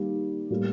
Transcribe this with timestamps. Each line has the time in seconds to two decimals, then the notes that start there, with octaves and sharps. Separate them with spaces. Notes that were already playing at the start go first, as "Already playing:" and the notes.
Already playing: D#3 G3 A#3
0.50 A2 G3 A#3